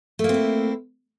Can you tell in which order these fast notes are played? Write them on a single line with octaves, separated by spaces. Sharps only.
A3 A#3 C4 E4